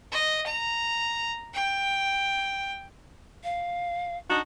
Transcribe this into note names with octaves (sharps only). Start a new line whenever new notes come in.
D#5
A#5
G5
F5
D4 D#4 F#4